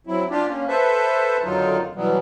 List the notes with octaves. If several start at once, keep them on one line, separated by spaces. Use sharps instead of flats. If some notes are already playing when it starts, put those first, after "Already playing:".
F#3 C4 E4
D4 F4 G4
A#3 C#4
A4 B4 C5 E5
F2 D3 D#3 F#3 D#4 F4
B2 E3 F#3 G3 B3